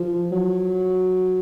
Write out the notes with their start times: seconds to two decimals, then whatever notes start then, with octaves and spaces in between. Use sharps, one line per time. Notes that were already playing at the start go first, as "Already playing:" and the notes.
Already playing: F3
0.31 F#3